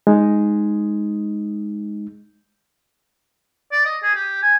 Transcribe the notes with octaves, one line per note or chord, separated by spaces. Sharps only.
G#3 D#4
D5
D#5
G#4
G4
G#5